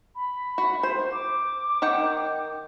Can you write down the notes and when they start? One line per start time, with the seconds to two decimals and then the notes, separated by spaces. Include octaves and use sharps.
0.15 B5
0.58 F#4
0.83 C5
1.12 D6
1.82 D#3 F#5 G5